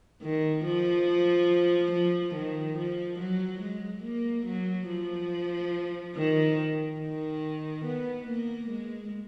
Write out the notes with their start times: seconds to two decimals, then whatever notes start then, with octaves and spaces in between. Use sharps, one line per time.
0.22 D#3
0.65 F3
1.92 F3
2.35 D#3
2.77 F3
3.19 F#3
3.62 G#3
4.04 A#3
4.46 F#3
4.89 F3
6.16 D#3
7.00 D#3
7.85 B3
8.27 A#3
8.69 G#3